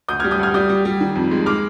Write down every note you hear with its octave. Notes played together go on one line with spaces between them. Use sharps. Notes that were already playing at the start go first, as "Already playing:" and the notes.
D2 D#6 G6
F6 G#6
G3
D#6 G6
D2 F6 G#6
G3 D#6 G6
G3
G3
D#3
F2
G#3
G#3 D6 F6